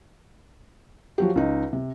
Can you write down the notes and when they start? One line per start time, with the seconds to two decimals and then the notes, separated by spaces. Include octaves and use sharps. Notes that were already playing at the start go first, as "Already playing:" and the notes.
1.18 F3 F#3 G4
1.36 C#2 D#4
1.73 C3